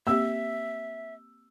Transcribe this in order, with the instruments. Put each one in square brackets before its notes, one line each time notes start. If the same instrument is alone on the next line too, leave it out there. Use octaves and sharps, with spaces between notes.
[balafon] A#3 C4 G4 [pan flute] E5 [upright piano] E6